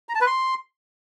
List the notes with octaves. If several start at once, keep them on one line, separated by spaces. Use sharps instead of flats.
A#5
A5
B4
C6